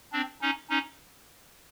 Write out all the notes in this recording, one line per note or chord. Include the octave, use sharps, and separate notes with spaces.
C4 D4
C#4 D#4
C#4 D#4